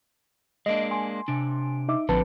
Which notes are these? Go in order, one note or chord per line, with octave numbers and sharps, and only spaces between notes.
G#3 A#3 D4 D#5
G#5 C6
C3 D4
D#4 E5 D6
A1 D3 F3 C4 B4 A5